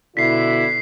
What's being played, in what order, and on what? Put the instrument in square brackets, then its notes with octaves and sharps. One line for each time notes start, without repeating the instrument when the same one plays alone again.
[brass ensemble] B2 D3 E4 [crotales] B6 C7